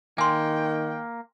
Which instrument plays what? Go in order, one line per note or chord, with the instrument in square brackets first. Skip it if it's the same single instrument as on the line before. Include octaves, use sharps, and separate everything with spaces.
[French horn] D#3 [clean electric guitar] A#3 [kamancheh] G5 [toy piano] G#5 C6